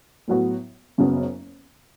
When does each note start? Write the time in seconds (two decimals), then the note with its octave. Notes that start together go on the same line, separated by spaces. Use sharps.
0.28 A2 F#3 B3 F#4
0.98 F#1 F#2 C#3 F#3 B3